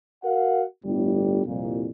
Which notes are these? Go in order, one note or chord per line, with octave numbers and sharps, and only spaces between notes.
F#4 A#4 F5 F#5
G1 A2 G3
C2 F2 A#2